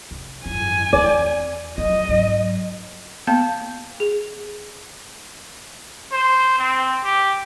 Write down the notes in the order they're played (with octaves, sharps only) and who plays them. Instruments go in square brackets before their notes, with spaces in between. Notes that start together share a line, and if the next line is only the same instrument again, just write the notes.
[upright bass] F1
[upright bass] G#1 F#2 [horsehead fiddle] G#5
[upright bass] E2 C4 [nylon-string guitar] D5
[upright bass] F#3 A3 [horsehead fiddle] D#5
[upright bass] G#2 F#3
[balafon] A#3 B3 F5 A5
G#4
[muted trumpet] C5
C4
G4